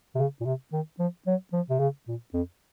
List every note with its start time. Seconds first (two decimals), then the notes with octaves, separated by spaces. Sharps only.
0.15 C3
0.18 C#3
0.41 A#2
0.45 C3
0.72 D#3
0.99 F3
1.27 F#3
1.53 F3
1.70 C3
1.79 C#3
2.08 A#2
2.34 F2